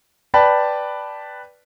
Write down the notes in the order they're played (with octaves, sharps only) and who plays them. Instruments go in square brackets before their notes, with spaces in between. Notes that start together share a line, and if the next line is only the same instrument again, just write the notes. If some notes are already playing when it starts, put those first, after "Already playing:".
[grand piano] B4 D5 G5 A5 B5